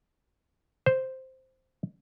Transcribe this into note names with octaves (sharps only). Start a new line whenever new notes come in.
C5